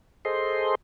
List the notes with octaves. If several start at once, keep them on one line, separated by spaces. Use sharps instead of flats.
G#4 A4 C5 D#5 C6